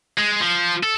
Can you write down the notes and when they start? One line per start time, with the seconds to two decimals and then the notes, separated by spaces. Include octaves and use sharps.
0.17 G#3
0.41 F3
0.83 A4